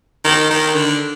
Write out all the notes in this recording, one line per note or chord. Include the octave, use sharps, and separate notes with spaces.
D#3
D#3
D3